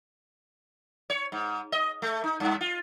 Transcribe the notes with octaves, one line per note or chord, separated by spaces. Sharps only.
C#5
G#2
D#5
A3
D#4
G2
F4